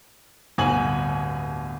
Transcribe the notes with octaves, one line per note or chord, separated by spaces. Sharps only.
D1 G1 G#5 F#7